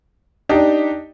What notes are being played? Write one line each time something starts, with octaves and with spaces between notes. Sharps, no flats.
D4 D#4 G4